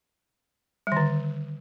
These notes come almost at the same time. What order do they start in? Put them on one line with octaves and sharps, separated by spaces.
G3 D#3 D3